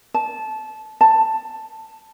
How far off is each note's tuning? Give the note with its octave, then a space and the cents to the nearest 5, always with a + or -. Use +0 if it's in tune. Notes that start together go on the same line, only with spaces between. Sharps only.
A5 -20
A5 +10